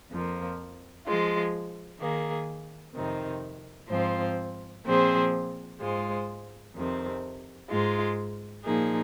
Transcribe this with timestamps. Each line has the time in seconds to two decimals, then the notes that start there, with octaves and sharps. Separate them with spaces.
0.11 F2 F3 A#3
1.07 F3 G#3 F4
2.01 D#3 A#3 G#4
2.96 F2 C3 D#3 C4 D#4
3.90 G#2 F3 C4 F4 C5
4.85 A#2 F3 C4 G#4 C5
5.80 G#2 G#3 F4 C5
6.75 F2 C3 D#3 C4
7.70 G#2 G#3 F4
8.65 A#2 F3 A#3 D#4 G#4